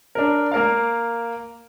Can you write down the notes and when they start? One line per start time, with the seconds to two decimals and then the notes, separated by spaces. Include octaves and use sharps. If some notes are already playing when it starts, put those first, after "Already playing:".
0.15 D4 A#4
0.52 A#3 A#4 F5